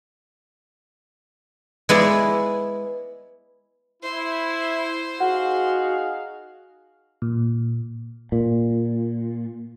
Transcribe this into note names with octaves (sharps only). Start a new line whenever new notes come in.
G#3 B3 E4 D5
E4 C5
D#4 F#4 G#4 F5 F#5
A#2
A#2